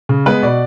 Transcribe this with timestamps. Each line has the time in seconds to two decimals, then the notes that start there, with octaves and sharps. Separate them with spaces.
0.09 C#3
0.26 G#3 B3 B4
0.43 B2 D5